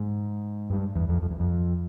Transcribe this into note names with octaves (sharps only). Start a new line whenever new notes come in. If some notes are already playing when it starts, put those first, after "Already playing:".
Already playing: G#2
G2
E2
F2
F2
E2
F2